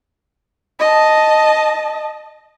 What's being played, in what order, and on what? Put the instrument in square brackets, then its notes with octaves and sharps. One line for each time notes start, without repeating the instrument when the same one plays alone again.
[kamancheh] D#5 A5